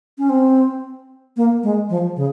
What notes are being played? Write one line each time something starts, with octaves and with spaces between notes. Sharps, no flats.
C#4
C4
A#3
G#3
F3
C#3